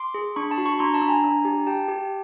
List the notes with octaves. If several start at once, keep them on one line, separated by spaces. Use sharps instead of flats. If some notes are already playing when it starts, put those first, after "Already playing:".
Already playing: C6 D6
G#4
D4 B5 C#6
A5 B5
F#4
B5 C#6
D4 A#5 C6
A5 B5
D4
G#5 A#5
D4
G4
G4 G5 A5
G4